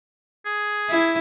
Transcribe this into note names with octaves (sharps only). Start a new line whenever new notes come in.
G#4
E4